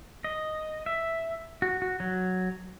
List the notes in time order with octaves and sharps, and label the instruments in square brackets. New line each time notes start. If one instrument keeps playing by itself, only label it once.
[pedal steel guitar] D#5
E5
F#4
F#4
F#3